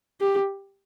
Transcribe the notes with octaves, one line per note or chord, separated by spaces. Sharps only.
G4